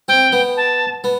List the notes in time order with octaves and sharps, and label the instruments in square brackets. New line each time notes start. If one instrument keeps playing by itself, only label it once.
[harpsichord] C4 [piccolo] G5
[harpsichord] B3
[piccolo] A5
[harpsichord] B3